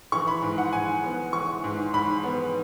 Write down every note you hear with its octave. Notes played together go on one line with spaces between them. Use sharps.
E3 C#6
B5
G#2
F#5
G#2 G#5
B3
E3 C#6
G#2
G#2 B5
B3